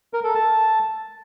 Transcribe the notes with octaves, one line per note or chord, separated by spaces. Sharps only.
A#4
A4
A5